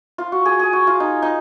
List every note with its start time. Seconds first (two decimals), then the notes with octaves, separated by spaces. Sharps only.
0.18 F4
0.32 F#4
0.45 G#4
0.59 G#4
0.73 F#4
0.87 F4
1.00 D#4
1.22 D#4